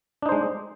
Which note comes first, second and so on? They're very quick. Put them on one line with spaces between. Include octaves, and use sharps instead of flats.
D4 D#4 C5 G#3